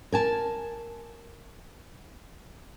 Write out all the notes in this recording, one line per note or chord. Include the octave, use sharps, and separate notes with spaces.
A#4 G#5 A5